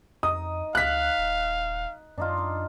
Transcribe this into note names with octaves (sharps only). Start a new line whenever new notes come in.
F2 D#4 D#6
C#2 F5 F#6 B6
D#1
F#2 D4 D#4 F4